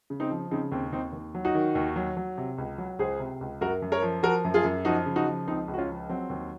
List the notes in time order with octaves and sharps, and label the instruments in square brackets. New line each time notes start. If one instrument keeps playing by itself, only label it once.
[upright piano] C#3
C4 D#4
F3
C#3 C4 D#4
D#2 C4
D#2 C4 D#4
D#2
F#3
D#4 F#4
D#3
D#2
F#3
F#3
C3
C#2
F#3
C#2 G#4 C5
C3
C#2
F#2 F#4 A#4
F#2
A#4 C#5
F3
F3 F#4 A#4
F#2
F4 G#4
F#2
F3 D#4 F#4
C#3
D#4 F#4
F3
C#2 C4 D#4
C#2
F#4
C#4 F4
F3
F#3 C4
D#2